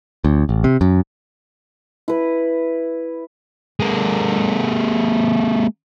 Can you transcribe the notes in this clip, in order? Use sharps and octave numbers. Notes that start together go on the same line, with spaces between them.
D2
A1
C3
F#2
E4 B4
G#3 A#3